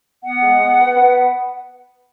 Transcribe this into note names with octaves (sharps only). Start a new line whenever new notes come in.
B3 F#5
G#3
B3
B3
B3